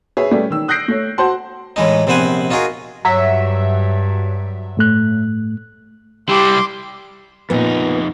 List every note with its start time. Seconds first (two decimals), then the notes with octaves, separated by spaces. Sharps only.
0.17 G#4 B4 C#5 E5
0.31 G3 A3 C#4 A4 B4 D5
0.50 D#3 E6
0.68 D#6 F#6 G6 A#6 C7 D7
0.88 A3 C#5
1.18 F#4 C5 F#5 A5 C6
1.76 A2 E3 G#3 D#4
2.07 A#1 C3 B3 C5 F#5 G#5
2.50 D#4 F4 F#4 G#4 A#4
3.05 G2 F#3 E5
4.77 A2 A3 F#6
6.29 G3 E4 G4 C6 D6
7.50 F2 A#2 B3 D#4